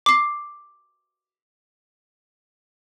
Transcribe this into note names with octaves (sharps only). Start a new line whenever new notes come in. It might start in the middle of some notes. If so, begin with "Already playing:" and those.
D6 C7